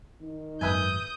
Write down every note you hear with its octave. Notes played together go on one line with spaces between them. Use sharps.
D#3
G#1 F#2 B4 E5 G#5 D#6 G6